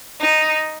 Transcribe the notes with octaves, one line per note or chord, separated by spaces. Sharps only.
D#4